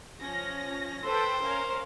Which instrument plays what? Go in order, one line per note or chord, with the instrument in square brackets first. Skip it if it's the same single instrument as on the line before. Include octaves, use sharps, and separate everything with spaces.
[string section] F3 C#4 A#6
[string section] A4 B4 G5 [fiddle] C5
[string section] C#4 A#4 F5